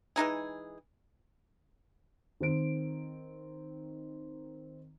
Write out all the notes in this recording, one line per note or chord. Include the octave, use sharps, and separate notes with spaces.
E3 G#3 D#4 G#4
D#3 C4 D7